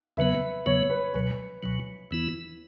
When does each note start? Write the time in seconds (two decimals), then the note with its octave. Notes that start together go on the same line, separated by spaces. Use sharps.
0.17 E2 C#3 F#3 B3 B4 E5
0.66 E2 C#3 F#3 B3 C#5
0.90 B4
1.14 C#2 B2 F#3 B4
1.63 C#2 B2 F#3
2.11 E2 E3 B3 E4